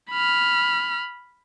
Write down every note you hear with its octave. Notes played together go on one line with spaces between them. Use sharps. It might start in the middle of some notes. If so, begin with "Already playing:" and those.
B5 F6